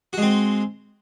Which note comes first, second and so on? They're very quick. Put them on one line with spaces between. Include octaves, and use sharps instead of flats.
F#4 G#3 C4